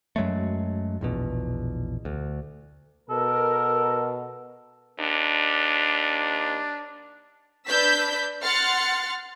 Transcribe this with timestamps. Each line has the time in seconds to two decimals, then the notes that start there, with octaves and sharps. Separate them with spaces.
0.16 F#2 F#3 G#3 A3
1.01 A#1 E2 B2
2.05 D2
3.10 B2 A4 A#4
5.00 D#2 D4
7.66 D4 B4 D5 E6 G6 B6
8.42 F#5 C6 F6 A6 C#7